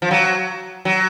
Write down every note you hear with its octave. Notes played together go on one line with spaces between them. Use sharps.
F3
F#3
F#3